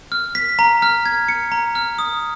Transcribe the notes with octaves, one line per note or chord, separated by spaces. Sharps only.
F6
B6
A#5
F6
G#6
C#7
A#5
F6
D#6